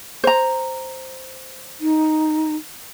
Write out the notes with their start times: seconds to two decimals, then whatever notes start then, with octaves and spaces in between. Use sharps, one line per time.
0.24 C5 A#5
1.81 D#4